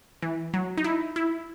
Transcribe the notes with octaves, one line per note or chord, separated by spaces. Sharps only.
E3
F#3
D#4
E4
E4